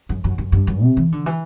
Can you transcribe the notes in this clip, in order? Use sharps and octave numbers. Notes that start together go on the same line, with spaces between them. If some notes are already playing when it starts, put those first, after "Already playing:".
F#2
F#2
F#2
G2
F#2
C3
E3
D3
E3